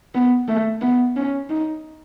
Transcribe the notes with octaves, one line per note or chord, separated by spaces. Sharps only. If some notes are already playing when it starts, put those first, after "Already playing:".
B3
A3
B3
C#4
D#4